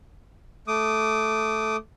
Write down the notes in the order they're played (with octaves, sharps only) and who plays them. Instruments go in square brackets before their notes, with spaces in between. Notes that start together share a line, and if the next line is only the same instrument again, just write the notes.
[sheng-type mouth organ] A3 D6 D#6